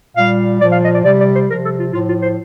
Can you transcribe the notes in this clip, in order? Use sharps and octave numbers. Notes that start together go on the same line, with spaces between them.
A#2 G3 F5
A#2 F3 D5
F5
D#5
D5
C3 G3 D5
D5
C5
C3 F3 A#4
A4
F4
A2 F3 F4
F4
C5